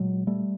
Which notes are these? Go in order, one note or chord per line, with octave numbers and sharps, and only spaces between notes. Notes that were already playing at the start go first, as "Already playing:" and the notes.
Already playing: A#2 F#3 G#3
G3 A3